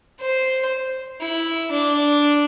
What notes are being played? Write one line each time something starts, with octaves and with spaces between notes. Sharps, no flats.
C5
E4
D4